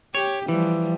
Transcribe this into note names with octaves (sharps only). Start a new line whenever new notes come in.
G4 C#5
E3 F3 G3